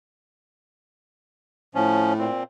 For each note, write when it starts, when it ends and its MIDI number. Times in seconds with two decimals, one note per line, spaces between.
1.75 2.29 45
1.75 2.13 53
1.75 2.13 61
2.19 2.43 46
2.19 2.43 60